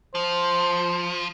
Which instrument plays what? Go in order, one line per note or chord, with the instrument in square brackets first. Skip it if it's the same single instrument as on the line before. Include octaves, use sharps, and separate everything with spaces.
[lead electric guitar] F3 [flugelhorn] C5